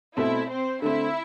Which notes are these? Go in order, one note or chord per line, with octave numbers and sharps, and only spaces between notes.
B2 A3 C4 E4 E5
C4 C5
D3 A3 C4 E4 E5